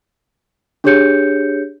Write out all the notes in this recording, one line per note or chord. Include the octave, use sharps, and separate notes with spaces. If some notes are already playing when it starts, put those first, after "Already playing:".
D4 G4 G#4 C#5 G6 C#7